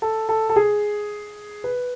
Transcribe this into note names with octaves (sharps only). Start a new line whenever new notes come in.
A4
A4
A4
G#4
B4